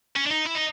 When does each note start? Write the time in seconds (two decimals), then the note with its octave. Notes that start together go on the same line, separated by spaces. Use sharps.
0.16 C#4
0.26 D4
0.31 D#4
0.46 E4
0.55 D#4